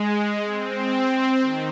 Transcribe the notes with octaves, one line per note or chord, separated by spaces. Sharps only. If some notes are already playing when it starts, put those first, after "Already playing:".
Already playing: G#3
C4
D#3